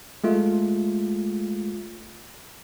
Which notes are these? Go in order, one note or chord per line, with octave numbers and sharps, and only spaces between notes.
G#3 A3 F4